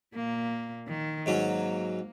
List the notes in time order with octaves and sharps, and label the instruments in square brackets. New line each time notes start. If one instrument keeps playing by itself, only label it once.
[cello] A#2 A#3
D#3
[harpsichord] G#2 F#3 C#4 [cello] A#3